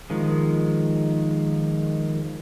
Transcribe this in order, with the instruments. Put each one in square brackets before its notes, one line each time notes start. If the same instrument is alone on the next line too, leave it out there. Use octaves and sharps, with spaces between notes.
[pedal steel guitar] D#3 F3 G#3